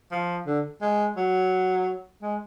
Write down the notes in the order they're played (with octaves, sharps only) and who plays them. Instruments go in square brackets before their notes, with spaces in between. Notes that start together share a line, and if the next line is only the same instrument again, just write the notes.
[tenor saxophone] F3
D3
G#3
F#3
G#3